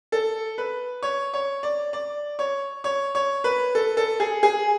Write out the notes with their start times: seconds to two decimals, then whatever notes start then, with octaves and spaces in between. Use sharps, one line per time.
0.12 A4
0.58 B4
1.02 C#5
1.33 C#5
1.63 D5
1.93 D5
2.39 C#5
2.84 C#5
3.15 C#5
3.44 B4
3.75 A4
3.97 A4
4.20 G#4
4.43 G#4